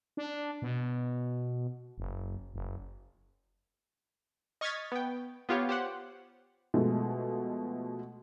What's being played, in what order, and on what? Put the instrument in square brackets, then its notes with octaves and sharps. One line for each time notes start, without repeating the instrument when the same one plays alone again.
[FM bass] D4
B2
F#1
F#1
[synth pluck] D#5 C#6 F6 G#6 A6 B6
B3 G5
B3 F4 G4 C#5
G4 C5 F#5
[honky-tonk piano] B2 F3 G#3 A3